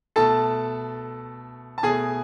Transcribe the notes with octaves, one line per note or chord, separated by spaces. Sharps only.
B2 A3 A4 A5
A5
B2 A3 G#4 G#5